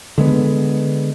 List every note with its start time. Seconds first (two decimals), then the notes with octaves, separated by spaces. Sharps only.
0.18 D3 G#3 B3